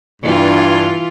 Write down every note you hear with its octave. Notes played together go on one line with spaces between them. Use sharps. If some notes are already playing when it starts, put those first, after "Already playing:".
G2 E3 F4